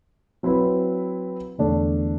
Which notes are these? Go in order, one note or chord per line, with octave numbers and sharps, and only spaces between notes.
F#3 C4 E4 B4
E2 D3 A3 D4